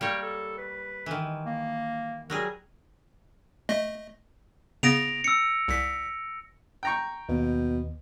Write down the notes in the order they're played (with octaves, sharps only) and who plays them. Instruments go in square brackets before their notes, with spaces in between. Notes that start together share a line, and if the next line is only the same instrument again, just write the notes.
[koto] G3 A#3 C#5 [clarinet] G5
[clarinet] A4
B4
[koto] D#3 E3
[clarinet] A#3
[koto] F#3 G3 G#4 [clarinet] A#4
[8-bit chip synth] A3 D#5
[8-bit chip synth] C#3 B3 [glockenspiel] A#6 D7 F7
[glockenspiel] E6 C#7
[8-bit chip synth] C2 B6
[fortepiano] G5 A#5 C#6
[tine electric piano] D#2 [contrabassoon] B2